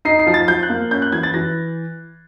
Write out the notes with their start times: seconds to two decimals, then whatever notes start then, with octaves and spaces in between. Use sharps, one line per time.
0.05 D#4 C7
0.19 C7
0.27 F3
0.34 A6
0.48 F3 G6
0.63 F#6
0.70 A#3
0.91 C#4 G6
1.02 F#6
1.12 E3 G#6
1.23 A6
1.34 E3 A#6